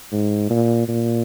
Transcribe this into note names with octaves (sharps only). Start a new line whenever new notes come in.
G#2
A#2
A#2